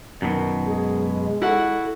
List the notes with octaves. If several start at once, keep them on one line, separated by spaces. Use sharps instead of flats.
F#2 B2 D#3
G#3 G#4
E4 F#4 A4 F#5